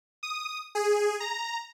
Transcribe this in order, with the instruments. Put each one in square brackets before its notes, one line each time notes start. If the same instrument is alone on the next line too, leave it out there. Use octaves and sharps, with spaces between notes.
[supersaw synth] D#6
G#4
A#5